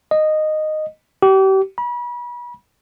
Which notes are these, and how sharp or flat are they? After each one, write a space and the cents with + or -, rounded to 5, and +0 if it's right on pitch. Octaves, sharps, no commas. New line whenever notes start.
D#5 -10
G4 -35
B5 -35